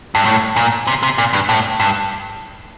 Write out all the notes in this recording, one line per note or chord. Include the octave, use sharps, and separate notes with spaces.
G2
A2
A#2
C3
C3
A#2
G2
A2
G2